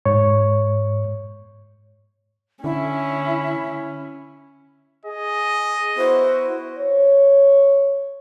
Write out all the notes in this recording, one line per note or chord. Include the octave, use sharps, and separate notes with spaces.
G#2 C#5 C#6
D3 C#4 E4
G#4 D#5
B3 E4 F#4 C5
C#5